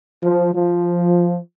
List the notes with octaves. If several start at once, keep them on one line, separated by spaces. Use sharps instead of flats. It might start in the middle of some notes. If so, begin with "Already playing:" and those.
F3
F3